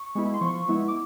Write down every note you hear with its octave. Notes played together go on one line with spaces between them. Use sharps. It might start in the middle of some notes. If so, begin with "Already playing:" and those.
Already playing: C#6
G#3 B3 E4
C6
F3 C#6
G#3 B3 E4
D6